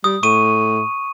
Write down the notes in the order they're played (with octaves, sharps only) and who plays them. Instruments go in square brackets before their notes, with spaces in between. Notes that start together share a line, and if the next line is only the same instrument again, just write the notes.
[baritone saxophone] G3 [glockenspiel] D#6
[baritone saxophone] A2 [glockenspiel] C#6 D#7